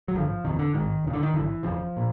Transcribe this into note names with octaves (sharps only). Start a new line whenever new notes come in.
F#3
G#1 G2 D3 F3
F#1 E2 C3 D#3
D3
G#1 G#2 D#3
E1 D#2 C#3
D3
D#3
G#1 F#2 D3 E3
F#1 E2 C#3 F3
A#2